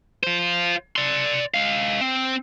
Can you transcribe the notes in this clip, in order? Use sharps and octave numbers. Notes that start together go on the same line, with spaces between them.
F4 C5
D5 C6
G#3 F5
C4